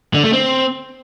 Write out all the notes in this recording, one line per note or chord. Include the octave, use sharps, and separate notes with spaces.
D3
A3
C4